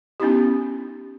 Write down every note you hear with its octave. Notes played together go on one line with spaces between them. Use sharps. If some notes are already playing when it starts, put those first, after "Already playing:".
B3 C#4 D#4 E4 G4